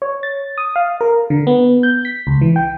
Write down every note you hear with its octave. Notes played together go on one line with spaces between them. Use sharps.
C#5
A6
D#6
F5
A#4
D3
B3
G6
B6
C#2
E3
G5